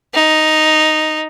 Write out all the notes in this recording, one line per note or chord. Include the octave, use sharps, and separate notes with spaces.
D#4